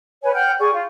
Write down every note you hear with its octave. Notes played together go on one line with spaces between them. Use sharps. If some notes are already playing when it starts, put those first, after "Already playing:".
B4 C#5 G#5
F#5 G5 F6 G6
G#4 D5 C#6
F4